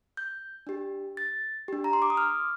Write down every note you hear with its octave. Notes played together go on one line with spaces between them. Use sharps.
G6
D4 G4
A6
D4 G4
A#5
C6
D6
D#6
F6